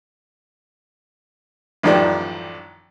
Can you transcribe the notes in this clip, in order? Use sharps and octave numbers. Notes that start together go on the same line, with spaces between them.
A1 F#2 D#3 F3 G3 D4